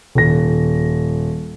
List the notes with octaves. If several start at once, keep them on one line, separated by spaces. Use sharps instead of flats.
D#1 A#6